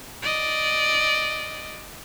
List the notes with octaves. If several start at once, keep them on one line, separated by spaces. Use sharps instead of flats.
D5 D#5